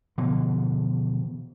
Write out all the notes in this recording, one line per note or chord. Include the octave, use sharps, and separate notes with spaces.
B2 D3 E3 F3